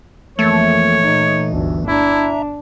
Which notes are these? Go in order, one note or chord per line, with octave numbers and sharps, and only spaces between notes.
F2 E3 A3 A#3 C#5
A#2 D#4
G1 D2
D4 E4 E5 A#5